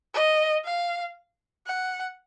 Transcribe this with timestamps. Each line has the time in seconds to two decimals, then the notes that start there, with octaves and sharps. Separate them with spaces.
0.14 D#5
0.65 F5
1.66 F#5